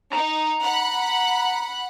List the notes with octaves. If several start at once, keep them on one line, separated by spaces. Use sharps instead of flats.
D#4 A#5
F#5 B5 F#6